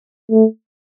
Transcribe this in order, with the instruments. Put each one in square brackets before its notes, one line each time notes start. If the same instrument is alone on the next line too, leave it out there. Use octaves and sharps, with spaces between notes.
[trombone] A3